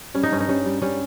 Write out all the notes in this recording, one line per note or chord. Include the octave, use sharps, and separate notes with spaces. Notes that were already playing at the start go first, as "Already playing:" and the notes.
G3 C#4
D#4
G2 C#4
D#4
G3 C#4
G3
G3 C#4